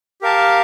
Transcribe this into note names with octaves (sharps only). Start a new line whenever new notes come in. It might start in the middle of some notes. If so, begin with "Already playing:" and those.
G4 A#4 F5 A5